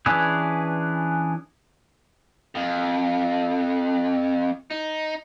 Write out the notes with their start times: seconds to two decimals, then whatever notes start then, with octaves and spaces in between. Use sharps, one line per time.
0.06 E3 C#4 D4 G#4 B4
2.55 F2
4.71 D#4